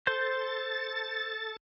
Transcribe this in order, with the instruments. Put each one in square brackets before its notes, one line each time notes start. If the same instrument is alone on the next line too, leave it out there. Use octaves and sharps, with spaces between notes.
[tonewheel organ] A4 A6 [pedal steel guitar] C5 C6 G6